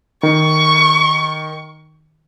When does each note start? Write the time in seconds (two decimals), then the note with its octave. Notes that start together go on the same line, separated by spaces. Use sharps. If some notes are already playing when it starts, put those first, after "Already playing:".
0.23 D#3 C#6